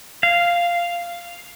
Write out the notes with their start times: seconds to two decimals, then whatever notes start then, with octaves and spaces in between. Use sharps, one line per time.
0.23 F5